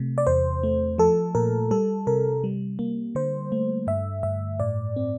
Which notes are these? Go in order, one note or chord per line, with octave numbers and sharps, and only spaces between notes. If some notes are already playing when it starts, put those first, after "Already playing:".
Already playing: C3 A3
D5
E2 C5
A3
F3 A4
A#2 A#4
G3 A4
C3 A#4
G3
A#3
D3 C5
A3
G2 E5
G2 E5
A2 D5
C4